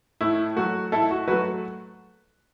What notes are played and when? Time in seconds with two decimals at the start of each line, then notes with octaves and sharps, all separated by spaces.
0.21 A2 E4
0.56 F#3 A3 F#4
0.92 A2 E4 A4
1.11 F#4
1.28 F#3 A3 F#4 B4